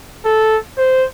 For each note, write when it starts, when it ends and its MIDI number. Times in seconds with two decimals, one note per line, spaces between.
0.25 0.57 69
0.78 1.05 72